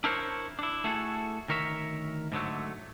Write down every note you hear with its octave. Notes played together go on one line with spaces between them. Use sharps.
D4 E4 A#4 C5 C#5
D4 E4
A3 E4 F#4 G#4 A4
D2 D#3 A#4 C#5 E5
G#2 D3 F#3 A3